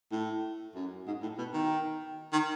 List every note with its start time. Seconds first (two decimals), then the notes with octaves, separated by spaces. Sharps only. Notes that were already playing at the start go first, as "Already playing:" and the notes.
0.11 A2
0.75 F#2
1.07 G#2
1.22 A2
1.38 B2
1.53 D#3
2.33 D#3